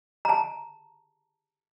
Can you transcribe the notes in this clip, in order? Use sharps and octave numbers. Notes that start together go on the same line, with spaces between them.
A5 A#5